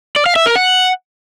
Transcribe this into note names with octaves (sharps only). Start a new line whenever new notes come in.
D5
F5
E5
A#4
F#5